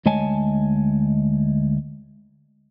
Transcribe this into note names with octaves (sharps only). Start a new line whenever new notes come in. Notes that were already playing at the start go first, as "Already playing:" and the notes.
D2 G#3 C#5 D#5 G#5 A5